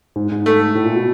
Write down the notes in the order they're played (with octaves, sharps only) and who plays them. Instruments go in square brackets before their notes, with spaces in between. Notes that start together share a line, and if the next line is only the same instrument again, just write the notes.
[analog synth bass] G#2
G#2
[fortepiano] A3
[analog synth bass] A2
A#2
B2